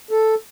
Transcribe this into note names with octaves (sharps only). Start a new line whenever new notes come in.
A4